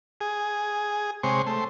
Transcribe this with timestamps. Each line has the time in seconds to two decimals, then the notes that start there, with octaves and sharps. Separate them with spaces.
0.21 G#4
1.23 C3 G#3 C5 C#5
1.47 A3 C5